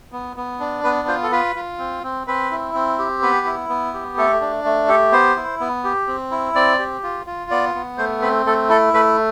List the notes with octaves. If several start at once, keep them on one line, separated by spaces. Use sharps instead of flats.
B3
B3
D4
B3 B4
F4 C5
A4
F4 B4
F4
C4
C4
C4 B4
E4
C4
G4
B3 B4
E4
B3
G4
A3 A4
D4
A3
G4 A4
B3 C5
E4
B3
G4
C4
E4
C4 D5
G4
F4
F4
B3 D5
B3
A3 C5
C4 B4
A3 A4
E4 A4
A3 B4